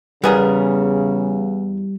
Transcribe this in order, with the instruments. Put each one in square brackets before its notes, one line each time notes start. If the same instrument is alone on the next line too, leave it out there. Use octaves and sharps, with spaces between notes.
[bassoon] E2 [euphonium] C#3 [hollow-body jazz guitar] G3 [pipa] B3 G#4 A#4